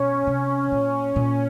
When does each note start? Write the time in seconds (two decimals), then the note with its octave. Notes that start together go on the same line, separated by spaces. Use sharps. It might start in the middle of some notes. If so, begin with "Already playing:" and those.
Already playing: B2 C#4
0.27 C3
0.72 A#2
1.16 A#2